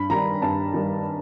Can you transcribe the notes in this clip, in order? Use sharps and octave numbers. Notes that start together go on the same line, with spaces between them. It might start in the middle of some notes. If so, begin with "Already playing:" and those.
Already playing: G2 B5
D#3 G3 A#5
G2 A5
D#3 G3